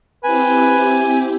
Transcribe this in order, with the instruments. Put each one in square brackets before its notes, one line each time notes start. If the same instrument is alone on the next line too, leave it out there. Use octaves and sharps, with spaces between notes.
[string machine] C4 E4 G4 [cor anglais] B4 [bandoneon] G#5